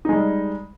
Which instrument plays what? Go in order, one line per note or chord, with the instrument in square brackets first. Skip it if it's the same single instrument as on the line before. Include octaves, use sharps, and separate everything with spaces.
[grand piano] D#4
G#3
G3